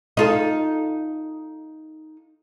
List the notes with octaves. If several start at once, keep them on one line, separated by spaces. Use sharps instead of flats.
D#4 F4 A4